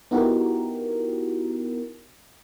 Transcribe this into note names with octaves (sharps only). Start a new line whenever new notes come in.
B3 D#4 E4 F#4 G4 A#4